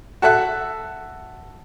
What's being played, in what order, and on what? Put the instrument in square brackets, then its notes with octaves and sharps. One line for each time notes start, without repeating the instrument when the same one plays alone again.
[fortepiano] F#4 A4 E5 F#6